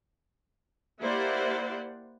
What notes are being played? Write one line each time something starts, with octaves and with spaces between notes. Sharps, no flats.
A#3 E4 G4 C5 D5 F#5